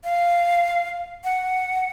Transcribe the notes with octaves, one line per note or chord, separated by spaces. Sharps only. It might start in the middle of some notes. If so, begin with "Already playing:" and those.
F5
F#5